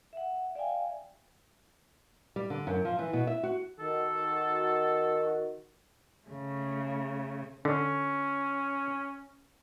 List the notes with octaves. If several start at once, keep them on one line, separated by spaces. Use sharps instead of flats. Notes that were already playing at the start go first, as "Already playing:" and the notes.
E5 F#5
D5 E5 F5 G5 G#5
G3
D3
F#2
F3
E3
B2
E5
F#4
D#3 F#4 A4
C#3 A3
D3 C#4